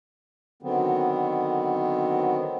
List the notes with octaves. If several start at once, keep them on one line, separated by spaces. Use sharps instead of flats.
D3 D#3 F#3 B3 C4